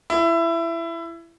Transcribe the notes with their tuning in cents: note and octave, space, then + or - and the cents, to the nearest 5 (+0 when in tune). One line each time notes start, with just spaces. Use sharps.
E4 +20